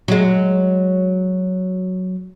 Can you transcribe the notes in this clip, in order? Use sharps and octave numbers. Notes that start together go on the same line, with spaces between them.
F#3 G#3